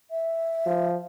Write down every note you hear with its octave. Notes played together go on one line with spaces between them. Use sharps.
E5
F3